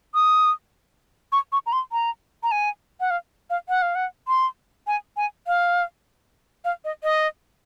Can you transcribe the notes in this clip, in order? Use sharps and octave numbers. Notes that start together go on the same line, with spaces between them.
D#6
C#6
C#6
A#5
C6
A#5
A#5
G#5
F#5
F5
F5
F#5
F5
F#5
C6
G#5
G#5
F5
F5
D#5
D#5